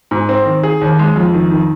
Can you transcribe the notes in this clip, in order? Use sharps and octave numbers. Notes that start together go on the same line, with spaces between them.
G#2
C4
D#3
G#4
D#2
G#3
F2
D#3
D#3